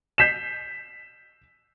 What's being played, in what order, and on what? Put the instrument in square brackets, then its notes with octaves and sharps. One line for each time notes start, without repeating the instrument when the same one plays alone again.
[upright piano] G6 B6 C7 E7